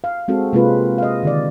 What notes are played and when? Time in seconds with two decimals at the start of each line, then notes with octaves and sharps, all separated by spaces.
0.04 F5
0.28 G#3 C4 F#4 A4
0.53 C3 G#3 A#3 C4 F4 B4
0.98 D#5 F5
1.23 D3 D#3 D5